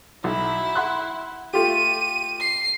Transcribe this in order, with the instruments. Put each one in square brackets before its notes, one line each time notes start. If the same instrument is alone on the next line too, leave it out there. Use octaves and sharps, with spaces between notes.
[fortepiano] B1 [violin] E4
[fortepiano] F#5 C6 F#6
[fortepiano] A3 F4 G4 [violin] D#7
[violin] C7